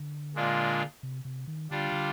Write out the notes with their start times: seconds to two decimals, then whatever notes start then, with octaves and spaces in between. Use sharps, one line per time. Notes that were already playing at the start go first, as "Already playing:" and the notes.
Already playing: D3
0.35 A#2 G#3 D4 F4
1.03 C3
1.25 C3
1.48 D#3
1.71 D3 G3 D4 F4
1.92 D3